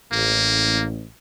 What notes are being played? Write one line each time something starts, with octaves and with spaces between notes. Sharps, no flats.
A1 A#3